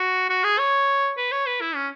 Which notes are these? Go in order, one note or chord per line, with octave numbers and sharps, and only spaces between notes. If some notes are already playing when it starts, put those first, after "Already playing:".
Already playing: F#4
F#4
G#4
C#5
B4
C#5
B4
E4
C#4